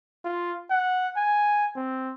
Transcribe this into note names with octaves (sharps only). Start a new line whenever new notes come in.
F4
F#5
G#5
C4